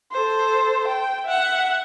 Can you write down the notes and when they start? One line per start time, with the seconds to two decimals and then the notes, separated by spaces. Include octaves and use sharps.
0.12 A4 C5
0.88 G5
1.25 E5 F#5